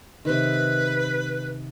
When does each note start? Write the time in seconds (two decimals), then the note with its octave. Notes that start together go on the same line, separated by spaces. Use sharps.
0.25 C3 D#3 B4